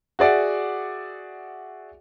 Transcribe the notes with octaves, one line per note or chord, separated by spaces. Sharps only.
F#4 G#4 D5 E5 F#5